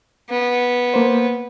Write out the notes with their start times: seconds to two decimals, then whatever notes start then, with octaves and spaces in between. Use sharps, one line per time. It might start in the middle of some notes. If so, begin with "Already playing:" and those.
0.29 B3
0.94 A#3 C5